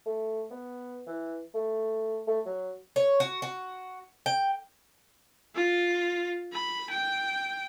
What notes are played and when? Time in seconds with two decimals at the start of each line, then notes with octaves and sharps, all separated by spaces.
0.06 A3
0.51 B3
1.07 E3
1.55 A3
2.27 A3
2.46 F#3
2.96 C#5
3.20 F#4
3.42 F#4
4.26 G5
5.55 F4
6.53 B5
6.90 G5